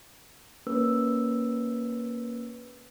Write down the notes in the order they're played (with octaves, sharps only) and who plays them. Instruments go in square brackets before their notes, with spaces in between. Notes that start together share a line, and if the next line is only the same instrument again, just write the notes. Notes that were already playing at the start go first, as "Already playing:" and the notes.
[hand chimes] A#3 C#4 A#4 B4 E6